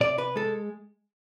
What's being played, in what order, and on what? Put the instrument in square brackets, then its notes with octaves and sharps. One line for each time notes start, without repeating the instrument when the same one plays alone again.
[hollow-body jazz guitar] C3 D5
B4
G#3 A4